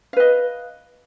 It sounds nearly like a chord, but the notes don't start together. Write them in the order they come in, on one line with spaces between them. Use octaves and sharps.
F5 B4 D#5